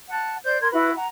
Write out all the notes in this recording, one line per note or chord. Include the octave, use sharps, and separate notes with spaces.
F#5 A5
C5 D5 G6
A#4 C6 G#6
E4 F#4 B4 B5
F#5 A#5